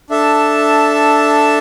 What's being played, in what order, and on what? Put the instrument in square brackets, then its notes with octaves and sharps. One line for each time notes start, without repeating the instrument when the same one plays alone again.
[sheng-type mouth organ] D4 A4 E5 A5